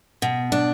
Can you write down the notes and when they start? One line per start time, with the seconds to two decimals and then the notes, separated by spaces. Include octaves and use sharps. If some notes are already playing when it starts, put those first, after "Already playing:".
0.22 B2
0.52 D4